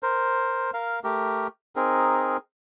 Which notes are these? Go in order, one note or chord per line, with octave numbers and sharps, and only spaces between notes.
A#4 C5
A#4 F5
A3 G4 A#4
C4 D#4 G#4 A#4